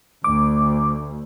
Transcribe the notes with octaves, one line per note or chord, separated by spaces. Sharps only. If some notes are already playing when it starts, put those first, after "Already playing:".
D2 D6